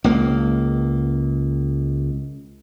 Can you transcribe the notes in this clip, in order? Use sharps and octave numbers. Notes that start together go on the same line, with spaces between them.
C#2 A#3